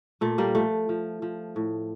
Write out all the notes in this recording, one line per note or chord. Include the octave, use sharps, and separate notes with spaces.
A#2 A3
G3 A#3
F3 A3
F3
F3
A2